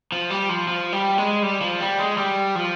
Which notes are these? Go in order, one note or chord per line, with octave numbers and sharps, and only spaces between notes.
F3
G3
F3
F3
G3
G#3
G3
F3
G3
G#3
G3
F3